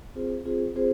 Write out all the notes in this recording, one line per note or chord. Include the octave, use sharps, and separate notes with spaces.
C4 F4 G#4 C5
C4 F4 G#4 C5
C4 F4 G#4 C5